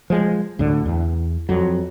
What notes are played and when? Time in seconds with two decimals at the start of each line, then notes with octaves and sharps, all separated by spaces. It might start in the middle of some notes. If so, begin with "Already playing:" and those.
0.10 F3 G#3
0.59 D2 A2 D3
0.86 E2
1.49 F2 F#3